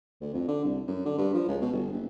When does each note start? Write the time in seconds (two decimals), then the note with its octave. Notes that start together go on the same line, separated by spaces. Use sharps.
0.21 D2
0.34 F2
0.48 D3
0.64 C2
0.88 F#2
1.06 D3
1.18 G2
1.34 F3
1.48 C#2
1.62 B2
1.73 G1
1.92 F#1